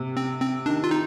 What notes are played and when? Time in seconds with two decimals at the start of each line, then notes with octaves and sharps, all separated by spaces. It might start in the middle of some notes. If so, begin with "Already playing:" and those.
Already playing: C3
0.17 C4
0.41 C4
0.66 D#3 D4
0.84 F4
0.91 D#4